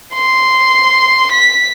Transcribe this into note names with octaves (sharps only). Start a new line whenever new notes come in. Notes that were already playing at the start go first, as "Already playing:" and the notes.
C6
B6